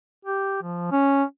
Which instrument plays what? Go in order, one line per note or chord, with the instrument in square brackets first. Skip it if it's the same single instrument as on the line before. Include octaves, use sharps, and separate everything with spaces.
[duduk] G4
F3
C#4